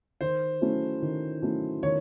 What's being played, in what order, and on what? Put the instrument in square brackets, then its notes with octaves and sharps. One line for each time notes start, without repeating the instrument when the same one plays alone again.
[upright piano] D#3 [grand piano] C5
[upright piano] F#3 A3 C#4 E4
D#3
F#3 A3 C#4 E4
[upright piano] D#3 [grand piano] C#5